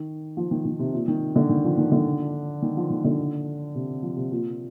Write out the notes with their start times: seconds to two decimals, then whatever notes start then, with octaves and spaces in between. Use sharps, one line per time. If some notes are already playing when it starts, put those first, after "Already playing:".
Already playing: D#3
0.37 F3
0.51 D#3
0.65 D#3
0.79 C3
0.93 A#2
1.08 D#3
1.36 D3
1.49 D#3
1.64 F3
1.78 D#3
1.92 D3
2.62 D#3
2.77 F3
2.90 D#3
3.04 D3
3.75 C3
4.02 F3
4.16 C3
4.31 A#2